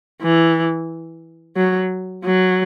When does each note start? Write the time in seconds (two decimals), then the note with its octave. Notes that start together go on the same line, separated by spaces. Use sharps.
0.22 E3
1.56 F#3
2.25 F#3